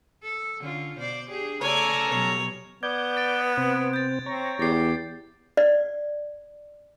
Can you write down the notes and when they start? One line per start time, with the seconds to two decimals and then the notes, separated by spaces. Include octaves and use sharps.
0.23 A4
0.61 D3 C#4 F4
0.97 B2 C5 D5
1.29 D4 G4 G#4
1.61 C#3 A3 C#4 A4 C#5 D5 G#5 A#5
2.09 B2 F#3 G3 C#5
2.83 B3 D5 G6 G#6
3.17 A6 D7
3.58 C3 C4
3.93 G6 A6
4.26 C4 C#5 A#5
4.60 E2 G4 A6 C7
5.57 D5